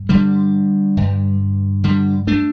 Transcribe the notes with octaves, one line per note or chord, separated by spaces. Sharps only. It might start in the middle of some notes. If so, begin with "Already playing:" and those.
Already playing: G2
D3 G3
G2 D3
D3 G3
A3 D4